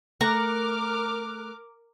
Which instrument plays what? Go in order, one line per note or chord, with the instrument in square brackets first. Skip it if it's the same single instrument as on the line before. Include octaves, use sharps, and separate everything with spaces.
[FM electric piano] A3 F#6 [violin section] A#4 D6 F6 [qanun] A#5 C#6